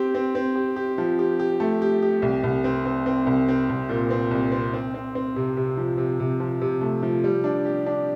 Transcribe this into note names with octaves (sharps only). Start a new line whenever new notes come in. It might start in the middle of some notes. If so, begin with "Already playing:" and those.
Already playing: C4 G4
C4
C4
G4
G4
F3
G4
G4
A3
G4
G4
C2
C2
C4
C4
C4
C2
C4
C2
A#2
C4
C2
C4
C4
C4
C4
C3
C3
F3
C3
C3
F3
C3
A3
F3
G3
D4
G4
D4